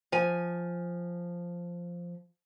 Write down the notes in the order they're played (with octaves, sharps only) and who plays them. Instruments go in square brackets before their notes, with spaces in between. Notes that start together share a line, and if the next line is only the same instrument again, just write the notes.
[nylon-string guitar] F3 G#5